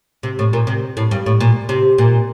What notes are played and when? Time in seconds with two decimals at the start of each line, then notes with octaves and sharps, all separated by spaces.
0.23 C3
0.39 A2
0.53 A#2
0.67 C3
0.97 A2
1.11 G2
1.26 A2
1.40 A#2
1.69 C3
1.98 A#2